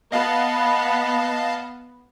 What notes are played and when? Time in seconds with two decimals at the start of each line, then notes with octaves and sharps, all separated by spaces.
0.12 B3 D#5 F5 A5